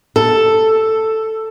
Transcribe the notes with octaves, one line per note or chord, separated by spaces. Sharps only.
A4